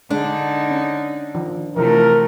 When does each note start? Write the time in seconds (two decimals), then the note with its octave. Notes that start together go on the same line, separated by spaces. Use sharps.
0.10 D3 G#3 D4 D#4
0.71 C#4
1.35 D#3 F3
1.76 C3 E3 F3 A3 G4 A#4